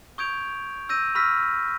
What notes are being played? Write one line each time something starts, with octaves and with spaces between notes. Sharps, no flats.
C#6 D#6 G6 G#6 D7 F7
E6 G6 A#6 D#7
B5 C#6 E6 F6 A#6 B6